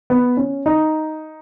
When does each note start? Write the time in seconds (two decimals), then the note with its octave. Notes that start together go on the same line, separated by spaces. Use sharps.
0.10 B3
0.37 C#4
0.66 D#4